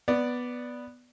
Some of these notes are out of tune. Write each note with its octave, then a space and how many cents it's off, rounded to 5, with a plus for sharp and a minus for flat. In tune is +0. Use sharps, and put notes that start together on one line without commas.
B3 +0 D5 +0